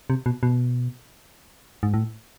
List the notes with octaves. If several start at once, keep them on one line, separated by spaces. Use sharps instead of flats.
C3
B2
B2
G#2
A2